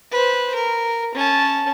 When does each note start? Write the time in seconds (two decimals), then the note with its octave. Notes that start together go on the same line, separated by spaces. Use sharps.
0.11 B4 C5
0.55 A#4
1.15 C#4 A5